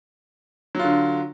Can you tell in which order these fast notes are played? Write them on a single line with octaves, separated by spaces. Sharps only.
F#3 F4 D3